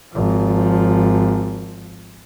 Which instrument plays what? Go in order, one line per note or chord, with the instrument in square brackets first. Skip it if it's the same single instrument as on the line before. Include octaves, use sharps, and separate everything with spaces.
[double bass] G#1 F3